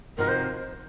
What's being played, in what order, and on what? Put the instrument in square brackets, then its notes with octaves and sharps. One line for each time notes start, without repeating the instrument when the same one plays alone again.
[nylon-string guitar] C3 F3 C4 D#4 F#4 [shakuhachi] A#4
[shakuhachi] C5